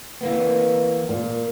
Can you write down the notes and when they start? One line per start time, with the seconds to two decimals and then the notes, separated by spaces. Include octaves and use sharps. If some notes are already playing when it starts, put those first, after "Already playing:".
0.21 E3 A#3 B3
1.09 A#2